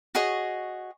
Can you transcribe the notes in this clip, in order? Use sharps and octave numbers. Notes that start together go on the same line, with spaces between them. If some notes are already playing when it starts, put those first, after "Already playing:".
F#4 G#4 C#5 D#5